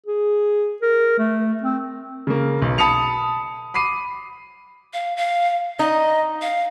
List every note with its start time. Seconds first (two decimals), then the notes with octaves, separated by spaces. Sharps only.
0.06 G#4
0.82 A#4
1.19 A3
1.63 C4
2.27 C#3 A#3
2.62 B1
2.78 A5 B5 D#6 C#7 F7
3.74 B5 D6 C7 D#7
4.93 F5
5.17 F5
5.79 D#4 D#5
6.42 F5